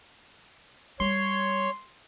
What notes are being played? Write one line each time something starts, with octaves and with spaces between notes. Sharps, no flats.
G3 C#5 C6